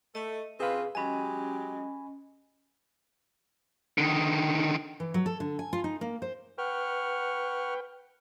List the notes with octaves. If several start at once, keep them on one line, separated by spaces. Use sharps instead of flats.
A3 A4 D#5
C4 F4 G#4 B4 F5
F#3 G#3 C#4 G4 D#5 G#5 B5
D3 D#3
E3
F#3
A4
D3
G#5
F4
D#4
A#3
C5
B4 F#5 G5 C#6 F6